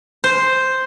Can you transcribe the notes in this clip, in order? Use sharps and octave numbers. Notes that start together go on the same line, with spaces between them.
C5